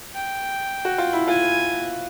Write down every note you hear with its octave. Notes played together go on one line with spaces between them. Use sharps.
G5
F#4
F4
E4
F4 G#5